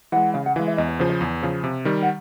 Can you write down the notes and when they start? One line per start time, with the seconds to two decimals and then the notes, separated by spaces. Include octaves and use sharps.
0.12 E3 G#3 F#5
0.34 C#3 F5
0.46 F#5
0.56 E3 G#3 F5
0.67 E5
0.77 E2 D#5
0.88 C#5
0.99 C#3 F3 C5
1.10 C#5
1.21 E2
1.43 C#3 F3
1.64 C3
1.85 D#3 G3
2.03 F#5